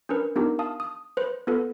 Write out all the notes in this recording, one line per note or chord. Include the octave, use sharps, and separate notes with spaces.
C#4 D4 A#4 B4
B3 D4 D#4 F4 G4 A#4
F5 A5 D#6
D#6
B4 C5
B3 F4 A4 B4